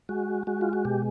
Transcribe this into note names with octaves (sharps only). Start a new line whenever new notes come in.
G#3 F#4
G#3 F#4
F4
F#4
B2 G4